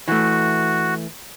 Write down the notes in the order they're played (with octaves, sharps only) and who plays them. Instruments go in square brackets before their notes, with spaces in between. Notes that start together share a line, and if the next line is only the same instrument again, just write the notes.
[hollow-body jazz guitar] E3 A3 [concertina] F#4